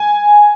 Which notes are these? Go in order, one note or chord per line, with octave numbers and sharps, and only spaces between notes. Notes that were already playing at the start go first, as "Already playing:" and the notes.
Already playing: G#5